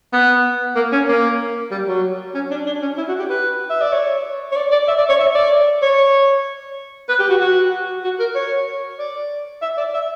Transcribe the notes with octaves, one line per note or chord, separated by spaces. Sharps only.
B3
A#3
C#4
A#3
G3
F#3
C#4
D4
D4
C#4
E4
F#4
G4
B4
E5
D5
C#5
C#5
D5
D5
E5
D5
C#5
E5
D5
C#5
B4
G4
F#4
F#4
F#4
A#4
C#5
D5
E5
D5
E5